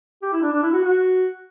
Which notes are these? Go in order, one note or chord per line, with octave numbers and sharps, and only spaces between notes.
G4
E4
D4
D4
E4
F#4
F#4